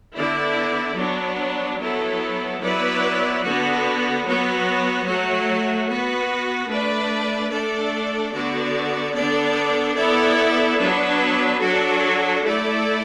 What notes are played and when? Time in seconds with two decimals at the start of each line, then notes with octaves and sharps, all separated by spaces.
0.16 D3 B3 E4 D5
0.97 F#3 B3 D4
1.79 F#3 B3 E4 A4
2.61 F#3 B3 E4 B4 D5
3.43 D3 B3 F#4
4.25 F#3 B3 F#4
5.07 F#3 A3 F#4
5.88 B3 F#4 B4
6.70 A3 D4 B4 D5
7.52 A3 D4 A4 D5
8.34 D3 B3 F#4 D5
9.16 D3 B3 D4 A4 D5
9.97 B3 E4 A4 D5
10.79 F#3 B3 D4 B4
11.61 F#3 D4 F#4 A4
12.43 A3 E4 A4 D5